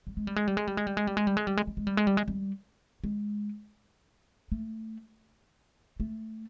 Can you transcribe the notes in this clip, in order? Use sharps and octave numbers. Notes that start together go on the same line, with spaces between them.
G3
G#3
G3
G#3
G3
G#3
G3
G#3
G3
G#3
G3
G#3
G3
G#3
G3
G#3
G3
G#3
G3
G#3
G3
G#3
G3
G#3
A3
A3